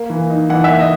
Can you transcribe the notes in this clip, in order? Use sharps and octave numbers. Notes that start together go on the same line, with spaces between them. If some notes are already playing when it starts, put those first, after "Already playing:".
Already playing: A#3
E3
D#4
E3 F#5
E5
A#3
D#5